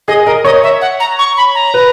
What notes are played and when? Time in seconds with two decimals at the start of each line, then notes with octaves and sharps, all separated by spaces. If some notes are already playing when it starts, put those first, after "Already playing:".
0.08 G#4 D#5
0.26 A#4 D#5
0.44 C#5 D#5
0.63 E5
0.81 F#5
1.00 A#5
1.19 C#6
1.37 B5
1.55 A#5
1.74 B4